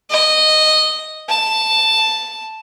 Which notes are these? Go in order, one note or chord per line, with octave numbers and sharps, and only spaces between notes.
D#5
A5